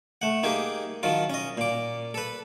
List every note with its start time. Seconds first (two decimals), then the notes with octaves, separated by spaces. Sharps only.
0.22 A3 F#5
0.43 A#3 D#4 G4 G#4
1.03 D#3 F3 F#3 F4
1.30 C#4 D#5
1.58 A#2 D6
2.14 A4 B4